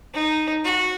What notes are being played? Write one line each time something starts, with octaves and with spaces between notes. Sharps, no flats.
D#4
F#4